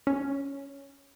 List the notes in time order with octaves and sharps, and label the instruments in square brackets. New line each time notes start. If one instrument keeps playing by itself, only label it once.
[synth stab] C#4